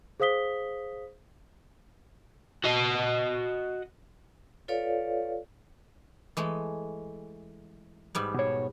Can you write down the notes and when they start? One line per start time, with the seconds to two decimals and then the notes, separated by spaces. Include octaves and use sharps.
0.20 G#4 C5 F5 D#6 B6 G7
2.64 F#4 D#5
4.68 F4 A4 B4 C#5 D5 F5
6.37 E3 G#3 A3
8.15 G#2 G3 B3
8.34 B2 C#5